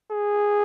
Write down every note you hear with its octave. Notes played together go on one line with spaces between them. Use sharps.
G#4